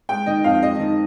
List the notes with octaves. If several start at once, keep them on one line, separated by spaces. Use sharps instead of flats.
G#3 G5
D#3 D#5
F2 F5
G#3 D#5
D#3